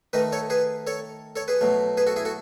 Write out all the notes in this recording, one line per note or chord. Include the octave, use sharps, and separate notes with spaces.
D#3 A3 D#4 B4 D#5
A4 C#5
G#4 B4
A4 C#5
A4 C#5
G#4 B4
B2 F#3 A3
G#4 B4
F#4 A4
E4 G#4
F#4 A4